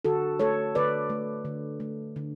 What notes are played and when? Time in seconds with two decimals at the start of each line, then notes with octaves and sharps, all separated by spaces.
0.05 D3 F#4 A4
0.39 A3 A4 C#5
0.75 D3 B4 D5
1.10 A3
1.45 D3
1.80 A3
2.16 D3